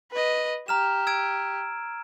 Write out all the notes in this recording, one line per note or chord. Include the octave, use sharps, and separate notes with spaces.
B4 D#5
G4 A#5 F6 E7
E6 G#6 D7